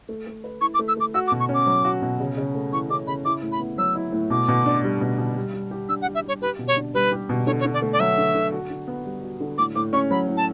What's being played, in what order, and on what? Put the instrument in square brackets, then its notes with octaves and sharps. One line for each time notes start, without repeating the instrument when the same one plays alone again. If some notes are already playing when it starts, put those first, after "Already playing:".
[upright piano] A3
A3
B4
[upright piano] E4 [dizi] C#6
[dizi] D6
[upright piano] A3
[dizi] E6
[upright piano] A3 [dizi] D6
[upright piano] F#4 [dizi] E6
[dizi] D6
[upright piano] B2
[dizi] C#6
[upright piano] C#4
[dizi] D6
[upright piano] F#3
F#4
B2
C#3
C#3
A3
[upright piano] E3 [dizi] C#6
[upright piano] C#3 [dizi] D6
[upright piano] C#3 [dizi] B5
[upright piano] E4 [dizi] D6
[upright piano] A2
[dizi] B5
[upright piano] B3
[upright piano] F#3 [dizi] E6
[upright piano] E4
A2
[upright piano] B2 [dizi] D6
[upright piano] B2
D4
G3
B2
B2
G3
G3
G4
[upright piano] D4 [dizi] E6
[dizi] F#5
[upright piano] G3
[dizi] E5
[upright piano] G3 [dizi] C#5
[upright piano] G4 [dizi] B4
[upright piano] B2
[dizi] C#5
[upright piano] D4
[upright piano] G3 [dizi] B4
[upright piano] G4
B2
[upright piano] D3 [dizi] C#5
[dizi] C#5
[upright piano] D3
[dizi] D5
[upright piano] A3
[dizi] D5
[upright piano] F#3 [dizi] E5
[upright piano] D3
D3
F#4
D3
B3
G3
F#4
D3
[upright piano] A2 [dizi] D6
[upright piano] A2 [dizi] D6
[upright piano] C#4 [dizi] C#6
[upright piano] F#3 [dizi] B5
[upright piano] A2
[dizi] A5